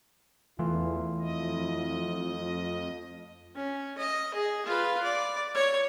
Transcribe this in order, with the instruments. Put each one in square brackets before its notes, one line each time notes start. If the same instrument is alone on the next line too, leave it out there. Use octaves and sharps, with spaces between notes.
[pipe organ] E2 [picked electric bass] E3 [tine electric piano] A3 F4 [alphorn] E4
[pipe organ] F2 D#5
[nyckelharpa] C#4
D#5
G#4
F4 B4
D5
C#5